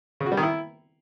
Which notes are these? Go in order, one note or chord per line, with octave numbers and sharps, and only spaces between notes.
C#3
F#4
G3
D#3
E4